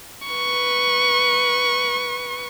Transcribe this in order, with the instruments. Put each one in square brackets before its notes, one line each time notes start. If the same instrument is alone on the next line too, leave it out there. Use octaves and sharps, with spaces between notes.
[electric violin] B4 C#6